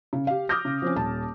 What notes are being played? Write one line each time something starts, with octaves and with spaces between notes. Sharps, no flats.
C#3
G4 F5
D6 D#6 F6 G6 A#6
C#3
F3 C4 C#4
D#1 A5